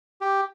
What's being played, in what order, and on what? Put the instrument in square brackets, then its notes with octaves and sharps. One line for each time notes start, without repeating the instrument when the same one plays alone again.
[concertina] G4